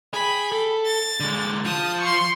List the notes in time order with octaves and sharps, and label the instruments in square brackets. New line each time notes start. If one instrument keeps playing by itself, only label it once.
[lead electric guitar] G#4 [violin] G5 B5
[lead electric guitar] A4
[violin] A6
[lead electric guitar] D3 G#3
[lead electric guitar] F3 [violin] A5 D#6
[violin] C6 C#6